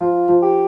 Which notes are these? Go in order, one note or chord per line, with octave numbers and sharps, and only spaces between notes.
F3 F4
F3
G4